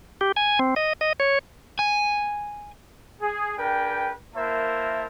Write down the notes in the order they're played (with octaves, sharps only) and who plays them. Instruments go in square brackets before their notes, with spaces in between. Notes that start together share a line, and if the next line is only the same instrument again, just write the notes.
[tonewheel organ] G4
G#5
C4
D#5
D#5
C#5
[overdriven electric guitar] G#5
[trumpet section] G#4
D4 G#4 A#4 B4 G5
A#3 E4 A#4 C5 E5 A5